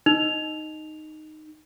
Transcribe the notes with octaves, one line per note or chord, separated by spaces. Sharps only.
D#4 F7